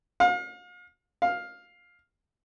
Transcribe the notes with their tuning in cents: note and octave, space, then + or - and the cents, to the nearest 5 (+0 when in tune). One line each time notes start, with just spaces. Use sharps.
F5 +40
F5 +10